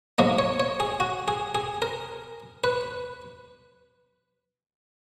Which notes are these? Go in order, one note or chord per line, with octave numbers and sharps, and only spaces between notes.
G#2 F#3 A#3 D#5
C#5
C#5
G#4
F#4
G#4
G#4
A#4
B4